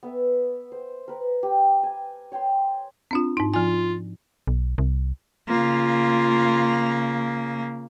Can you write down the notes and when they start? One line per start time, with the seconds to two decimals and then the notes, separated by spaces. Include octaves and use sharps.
0.03 B3 E5
0.72 C5
1.08 A#4 B4
1.43 G4
1.83 G#5
2.32 C#5 G5 G#5 C6
3.11 C4 D4 F4
3.37 G#2 D#4
3.54 F3 F4 G#5
4.47 B1
4.78 C2
5.48 C#3 A#3 F4